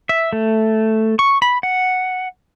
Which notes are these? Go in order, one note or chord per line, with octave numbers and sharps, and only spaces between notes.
E5
A3
C#6
B5
F#5